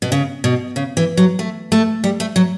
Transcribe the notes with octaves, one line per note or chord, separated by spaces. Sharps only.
B2
C#3
B2
C#3
E3
F#3
A3
A3
G3
A3
F#3